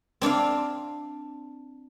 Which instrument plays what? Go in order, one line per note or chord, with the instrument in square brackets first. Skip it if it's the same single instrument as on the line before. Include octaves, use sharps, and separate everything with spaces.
[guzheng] C4 D4 D5 F5